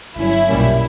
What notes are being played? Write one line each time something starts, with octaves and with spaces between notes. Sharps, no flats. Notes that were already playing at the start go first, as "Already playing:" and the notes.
G1 G2 F#3 C#4 E4
B1 A#2 G3 A#3 C#4